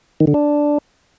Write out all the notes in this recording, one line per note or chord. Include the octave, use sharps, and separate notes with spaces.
D#3
D3
D4